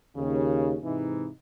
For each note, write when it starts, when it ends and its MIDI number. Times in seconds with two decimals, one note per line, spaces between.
0.16 0.74 39
0.16 0.74 49
0.83 1.28 44
0.83 1.28 48
0.83 1.28 52
0.83 1.28 63